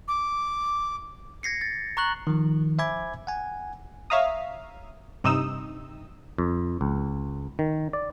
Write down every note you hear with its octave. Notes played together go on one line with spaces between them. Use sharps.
D6
G#6 A#6 C7 C#7
A6
A#5 C#6 F#6 F#7
D#3 F3
C5 E5 G#5 B5 D6 G#6
F#5 G#5
C#5 E5 F5 A#5 D#6
G2 C3 D#4 D#6 E6
F2
C#2
D#3
D5